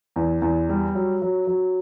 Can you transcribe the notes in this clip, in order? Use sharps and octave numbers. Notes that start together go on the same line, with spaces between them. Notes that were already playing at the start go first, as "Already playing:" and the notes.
E2
E2
G3
F#3
F#3
F#3